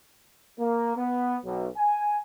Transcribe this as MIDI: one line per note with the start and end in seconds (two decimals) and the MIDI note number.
0.59 0.95 58
0.97 1.37 59
1.45 1.68 35
1.77 2.19 80